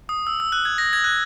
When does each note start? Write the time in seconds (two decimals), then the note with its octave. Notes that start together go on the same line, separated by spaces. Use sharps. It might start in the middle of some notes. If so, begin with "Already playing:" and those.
0.09 D#6
0.27 E6
0.40 E6
0.52 F#6
0.65 G#6
0.78 A#6
0.93 G#6
1.04 F#6